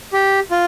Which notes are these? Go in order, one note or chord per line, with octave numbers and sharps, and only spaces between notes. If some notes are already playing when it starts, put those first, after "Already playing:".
G4
F4